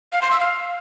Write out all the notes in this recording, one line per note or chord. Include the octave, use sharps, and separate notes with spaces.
F5
C6
E6
F5